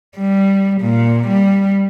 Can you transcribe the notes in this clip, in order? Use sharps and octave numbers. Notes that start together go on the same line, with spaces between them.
G3
A#2
G3